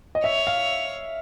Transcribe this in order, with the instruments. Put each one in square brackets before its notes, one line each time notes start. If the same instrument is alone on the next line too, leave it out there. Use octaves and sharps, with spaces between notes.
[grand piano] D#5
[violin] C#5 [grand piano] E5
[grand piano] F5